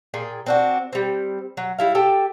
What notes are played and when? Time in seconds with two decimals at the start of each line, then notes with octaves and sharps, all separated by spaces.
0.14 A#2 G#4 G5
0.46 C4 D4 F#4
0.93 G3 C4
1.57 F#3
1.79 G3 E4 F5
1.95 G4 A4 G5 A5